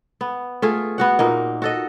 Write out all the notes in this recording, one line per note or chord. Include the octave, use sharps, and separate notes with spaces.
B3
A3 F4 G#4
B3 F#4 F#5
A#2 A#3 D#4
F#4 A4 D#5